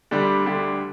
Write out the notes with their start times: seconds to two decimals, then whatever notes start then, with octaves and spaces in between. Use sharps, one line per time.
0.11 D2 D3 G3 D4 G4
0.46 D2 D3 G3 D4 G4